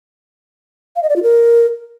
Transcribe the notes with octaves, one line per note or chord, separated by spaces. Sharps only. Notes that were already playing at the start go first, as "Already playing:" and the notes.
F5
D#5
D5
F4
A#4